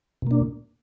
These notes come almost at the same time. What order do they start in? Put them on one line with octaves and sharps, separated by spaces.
B2 A#3 D4